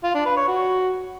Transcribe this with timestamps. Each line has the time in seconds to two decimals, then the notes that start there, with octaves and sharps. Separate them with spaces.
0.04 F4
0.15 D4
0.26 B4
0.37 C#5
0.48 F#4